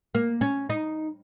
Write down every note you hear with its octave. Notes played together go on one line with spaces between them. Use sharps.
A#3
C#4
D#4